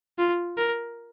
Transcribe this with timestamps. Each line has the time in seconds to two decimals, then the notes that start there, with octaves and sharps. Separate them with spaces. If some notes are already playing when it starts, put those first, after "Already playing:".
0.19 F4
0.58 A#4